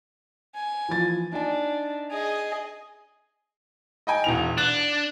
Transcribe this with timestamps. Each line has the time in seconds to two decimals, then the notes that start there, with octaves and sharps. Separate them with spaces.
0.55 G#5
0.89 E3 F3 A6
1.33 D4 D#4 G#5
2.11 G#4 D#5
4.07 D#5 G5 G#5
4.24 E1 E2 F7
4.58 D4 F#6